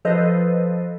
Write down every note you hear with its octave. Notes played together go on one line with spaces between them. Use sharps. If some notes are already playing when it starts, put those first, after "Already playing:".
F3 A4 B4 C5 D#5